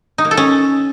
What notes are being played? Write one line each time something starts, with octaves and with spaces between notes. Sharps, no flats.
D#4
A#3
A4
C#4